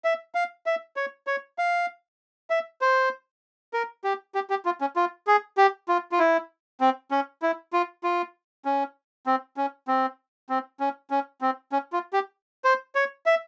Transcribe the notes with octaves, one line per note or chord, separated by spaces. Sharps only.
E5
F5
E5
C#5
C#5
F5
E5
C5
A#4
G4
G4
G4
F4
C#4
F4
G#4
G4
F4
F4
E4
C4
C#4
E4
F4
F4
C#4
C4
C#4
C4
C4
C#4
C#4
C4
C#4
F4
G4
C5
C#5
E5